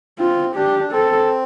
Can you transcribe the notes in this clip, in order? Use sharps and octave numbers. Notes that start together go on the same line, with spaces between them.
C4 F4
D4 G4
D4
C4 A4